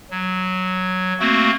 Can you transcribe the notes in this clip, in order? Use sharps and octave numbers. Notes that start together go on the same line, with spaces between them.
F#3
A3 A#3 C4 F#4